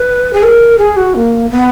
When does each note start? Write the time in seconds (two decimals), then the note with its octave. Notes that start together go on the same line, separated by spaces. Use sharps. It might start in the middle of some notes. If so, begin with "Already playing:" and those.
Already playing: B4
0.33 G#4
0.43 A#4
0.79 G#4
0.97 F#4
1.15 A#3
1.50 B3